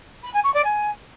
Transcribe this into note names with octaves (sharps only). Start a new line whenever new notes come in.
B5
G#5
C#6
D5
G#5